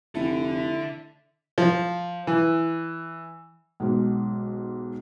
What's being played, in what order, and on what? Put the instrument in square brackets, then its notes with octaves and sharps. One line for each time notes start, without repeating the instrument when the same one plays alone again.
[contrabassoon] F1 [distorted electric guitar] D3 A4 [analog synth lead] E4 [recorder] E5
[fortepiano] F3
E3
[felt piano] B1 G#2